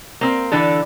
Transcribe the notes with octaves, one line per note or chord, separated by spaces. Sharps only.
A#3 C4
D3 E3 D4 A4